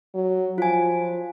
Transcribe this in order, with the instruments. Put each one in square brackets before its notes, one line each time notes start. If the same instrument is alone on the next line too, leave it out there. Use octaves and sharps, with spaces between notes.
[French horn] F#3
[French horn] F3 [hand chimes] F4 G#5